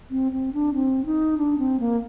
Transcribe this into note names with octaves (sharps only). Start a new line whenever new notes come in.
C4
C4
D4
C4
D#4
D4
C4
A#3